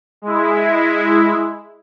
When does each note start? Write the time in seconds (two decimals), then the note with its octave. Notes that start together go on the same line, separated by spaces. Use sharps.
0.22 G#3 E4